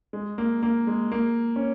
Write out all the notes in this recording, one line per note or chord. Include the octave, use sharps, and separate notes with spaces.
G#3
A#3
A#3
G#3
A#3
C#4